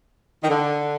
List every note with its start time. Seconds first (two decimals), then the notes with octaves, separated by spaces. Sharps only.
0.43 D#3
0.49 D3